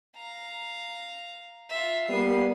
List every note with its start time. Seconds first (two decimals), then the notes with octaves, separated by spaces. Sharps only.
0.16 F5 A#5
1.70 F4 E5
2.09 G3 A#3 B3 C7 D#7